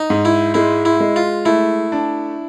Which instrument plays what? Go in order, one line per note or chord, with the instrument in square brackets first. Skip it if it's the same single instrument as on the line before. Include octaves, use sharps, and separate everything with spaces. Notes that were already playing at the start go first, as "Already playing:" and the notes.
Already playing: [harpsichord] D#4
[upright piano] G#2
[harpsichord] E4
[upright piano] G#3 [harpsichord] E4
[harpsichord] E4
[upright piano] G#3
[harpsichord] F4
[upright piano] A3 [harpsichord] E4
[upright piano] D4